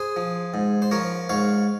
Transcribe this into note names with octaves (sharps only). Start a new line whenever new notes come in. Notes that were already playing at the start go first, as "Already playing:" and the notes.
Already playing: G#4 C5
F3
G#2
C5
F3 A#4 C#5
G#2 C#5 F5